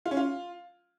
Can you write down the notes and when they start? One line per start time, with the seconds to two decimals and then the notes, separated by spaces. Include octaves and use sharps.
0.06 F4
0.11 C#4
0.17 F4